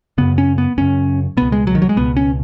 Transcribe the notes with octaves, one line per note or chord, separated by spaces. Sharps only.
F#2 C#3 B3
C#4
B3
F#2 C#3 C#4
C#2 B2 B3
G#3
F#3
D#3
F#3
G#3
C#2 B2 B3
C#4